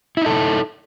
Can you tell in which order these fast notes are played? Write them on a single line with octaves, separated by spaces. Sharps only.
E4 D#4 A4